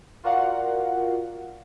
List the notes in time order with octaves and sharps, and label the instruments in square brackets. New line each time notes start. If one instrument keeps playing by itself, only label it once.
[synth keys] F4 F#4 A#4 D5 F5 F#5